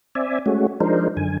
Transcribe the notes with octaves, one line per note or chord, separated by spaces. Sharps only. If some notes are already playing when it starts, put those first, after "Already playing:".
C4 D5 E5 G#5
G#3 A3 C#4 F#4
F3 G#3 D4 D#4 A#4 C5
F#2 D3 G#5